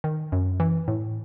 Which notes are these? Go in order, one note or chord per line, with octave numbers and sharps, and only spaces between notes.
D#3
F#2
E3
A2